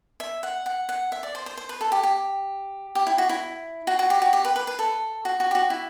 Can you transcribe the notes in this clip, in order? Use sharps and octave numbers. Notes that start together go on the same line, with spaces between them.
E5
F#5
F#5
F#5
E5
D5
C5
C5
C5
B4
A4
G4
G4
G4
E4
F#4
E4
F#4
F#4
G4
F#4
G4
B4
B4
B4
A4
F#4
F#4
G4
F#4
E4